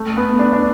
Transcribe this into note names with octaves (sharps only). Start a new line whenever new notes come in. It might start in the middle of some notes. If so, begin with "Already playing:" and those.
Already playing: A3
B3
D4
D4